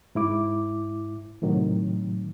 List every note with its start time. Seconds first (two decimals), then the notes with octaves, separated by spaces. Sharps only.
0.15 G#2 E4 D6
1.42 A2 C3 D#3 F#3